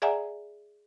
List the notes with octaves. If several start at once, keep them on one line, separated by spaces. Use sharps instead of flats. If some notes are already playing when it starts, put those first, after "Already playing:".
G#4 D5 E5 F#5 G#5 A#5